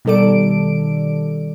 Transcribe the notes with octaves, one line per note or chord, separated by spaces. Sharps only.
B2 D#3 G3 A4 D5 D7